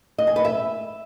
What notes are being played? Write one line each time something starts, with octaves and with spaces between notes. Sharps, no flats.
D#5
G#5
B4
E5